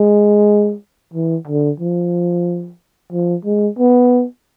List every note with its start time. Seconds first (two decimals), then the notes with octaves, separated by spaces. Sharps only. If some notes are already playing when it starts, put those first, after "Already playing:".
Already playing: G#3
1.14 E3
1.48 D3
1.80 F3
3.12 F3
3.45 G#3
3.78 B3